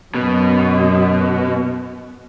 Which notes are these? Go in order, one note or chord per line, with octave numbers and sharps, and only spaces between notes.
F#2 B2